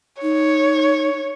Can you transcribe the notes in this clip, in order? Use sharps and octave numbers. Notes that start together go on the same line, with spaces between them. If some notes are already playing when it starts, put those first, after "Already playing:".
D#4 C#5